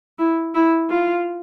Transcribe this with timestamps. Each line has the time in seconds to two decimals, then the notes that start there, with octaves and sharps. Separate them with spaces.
0.18 E4
0.55 E4
0.90 F4